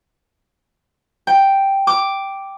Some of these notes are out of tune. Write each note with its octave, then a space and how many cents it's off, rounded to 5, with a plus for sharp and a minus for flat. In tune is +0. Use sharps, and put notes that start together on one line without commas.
G5 +0
D6 +0